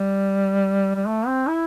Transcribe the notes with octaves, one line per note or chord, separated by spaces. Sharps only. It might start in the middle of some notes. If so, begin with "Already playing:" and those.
Already playing: G3
G3
A3
C4
E4